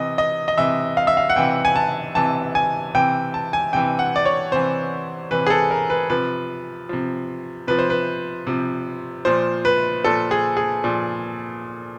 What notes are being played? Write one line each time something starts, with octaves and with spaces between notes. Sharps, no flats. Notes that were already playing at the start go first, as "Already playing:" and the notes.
Already playing: C3 E3 D#5
D#5
D#5
C3 E3 E5
F5
E5
F5
F#5
C3 E3 G5
G#5
A5
C3 E3 A5
G#5
C3 E3 G5
A5
G#5
C3 E3 G5
F#5
D5
C#5
C3 E3 C5
C3 E3 B4
G#4
A4
A#4
B4
C3 F3 B4
C3 F3
C3 F3 B4
C5
B4
C3 F3
A#2 F3 C5
B4
A#2 F3 A4
G#4
G#4
A#2 F3